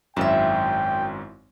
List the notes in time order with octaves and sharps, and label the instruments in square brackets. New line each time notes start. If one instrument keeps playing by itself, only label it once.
[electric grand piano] G#1 F#2 [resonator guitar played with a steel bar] E4 E5 [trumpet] G5